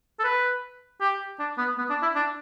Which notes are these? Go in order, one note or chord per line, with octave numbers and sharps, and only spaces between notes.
A4
B4
G4
D4
B3
B3
D4
E4
D4